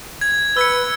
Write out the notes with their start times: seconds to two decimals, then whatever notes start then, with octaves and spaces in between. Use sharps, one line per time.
0.21 G#6
0.57 B4 E6 G#6 C#7